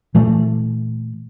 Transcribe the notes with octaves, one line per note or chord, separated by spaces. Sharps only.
A#2 E3 A3